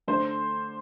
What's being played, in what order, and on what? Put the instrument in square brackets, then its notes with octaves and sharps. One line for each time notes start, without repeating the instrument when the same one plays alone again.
[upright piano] D3 A3 D4 C5